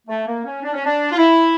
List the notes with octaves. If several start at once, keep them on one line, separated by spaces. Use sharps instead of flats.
A3
A#3
C#4
D4
C#4
D4
F4
E4